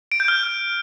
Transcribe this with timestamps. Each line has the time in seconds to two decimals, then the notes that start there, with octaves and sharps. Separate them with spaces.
0.12 D7
0.20 G6
0.28 F6